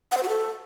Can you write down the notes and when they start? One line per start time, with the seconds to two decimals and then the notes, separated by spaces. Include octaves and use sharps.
0.12 F#5
0.17 C5
0.23 F#4
0.29 A4